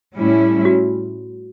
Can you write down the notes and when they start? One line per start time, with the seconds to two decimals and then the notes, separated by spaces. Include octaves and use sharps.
0.16 A2 G3 C#4 E4
0.65 F#4